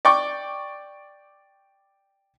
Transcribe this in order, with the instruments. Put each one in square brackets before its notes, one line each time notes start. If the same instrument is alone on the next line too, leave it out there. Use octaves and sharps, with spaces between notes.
[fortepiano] D5 G5 C#6 D6